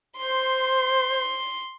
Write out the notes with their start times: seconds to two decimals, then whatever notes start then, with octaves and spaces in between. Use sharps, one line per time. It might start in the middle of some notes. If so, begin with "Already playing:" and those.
0.17 C5 C6